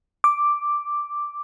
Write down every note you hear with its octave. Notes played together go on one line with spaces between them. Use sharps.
D6